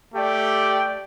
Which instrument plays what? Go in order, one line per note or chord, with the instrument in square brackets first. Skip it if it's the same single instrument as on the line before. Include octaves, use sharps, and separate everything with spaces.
[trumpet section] A3 G4 D5 G5